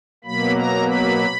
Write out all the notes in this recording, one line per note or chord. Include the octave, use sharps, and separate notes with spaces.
B2 F#3 A#3 B5
A#5
B5